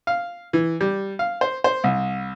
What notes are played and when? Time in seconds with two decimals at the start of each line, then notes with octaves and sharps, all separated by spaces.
0.07 F5
0.53 E3
0.81 G3
1.19 F5
1.41 C5
1.64 C5
1.84 C2